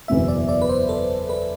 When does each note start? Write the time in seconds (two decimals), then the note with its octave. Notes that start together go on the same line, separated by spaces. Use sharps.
0.08 F#1 E2 B2 E5
0.28 D5
0.49 D5
0.61 B4
0.69 C5
0.89 A4
1.29 B4